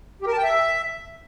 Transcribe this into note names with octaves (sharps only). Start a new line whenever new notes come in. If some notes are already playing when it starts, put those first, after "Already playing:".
G4
A#4
A5
G5
E5